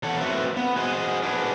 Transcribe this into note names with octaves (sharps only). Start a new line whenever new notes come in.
E2 A4 C#5 F#5
A3 C4 F#4 A#4 B4 E5
B3
F#4 G#4 C5 D#5
D4 F#4 G#4 B4